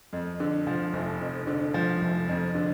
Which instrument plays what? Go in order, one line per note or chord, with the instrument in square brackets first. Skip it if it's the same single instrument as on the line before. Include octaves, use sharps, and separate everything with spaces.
[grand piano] F2
D3
F3
F1
F2
D3
F3
F1
F2
D3